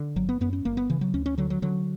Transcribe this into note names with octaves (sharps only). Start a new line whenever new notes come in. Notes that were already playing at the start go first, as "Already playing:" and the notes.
Already playing: D3
G1 F#3
B3
F#2 B3
C#4
G1 A#3
B3
C#3 E3
F#3
D2 C#4
C#4
D3 F#3
F#3
D3 F#3